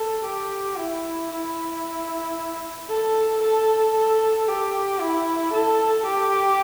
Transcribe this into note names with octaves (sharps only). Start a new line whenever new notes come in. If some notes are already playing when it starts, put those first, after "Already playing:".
Already playing: A4
G4
E4
E4
A4
A4
A4
G4
E4
A4
G4